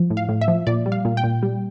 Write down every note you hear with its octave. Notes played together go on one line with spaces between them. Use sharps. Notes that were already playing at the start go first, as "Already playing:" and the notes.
Already playing: F3
A2
F5
A2
E5
F3
A#2 D5
G3
F5
A#2
G5
A#2
G3